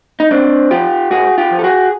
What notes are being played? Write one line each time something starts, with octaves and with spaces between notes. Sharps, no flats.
D#4
G#2 C4 D4
F3 F4 G4
G#2 F#4 G#4
F4 G4
F3
A4
F#4 G#4